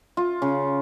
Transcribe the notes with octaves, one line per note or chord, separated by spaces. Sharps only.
F4
C#3